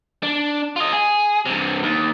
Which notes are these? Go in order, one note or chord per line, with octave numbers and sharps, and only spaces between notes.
D4
F4 D#5
G#4
G2 C3
D#2